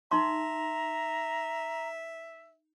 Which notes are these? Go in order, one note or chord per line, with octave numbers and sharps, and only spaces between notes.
D#4 E5 A#5 C6